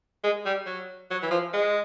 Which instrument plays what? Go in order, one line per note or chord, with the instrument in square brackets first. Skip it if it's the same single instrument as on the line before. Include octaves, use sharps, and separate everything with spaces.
[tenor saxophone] G#3
G3
F#3
F#3
E3
F3
G#3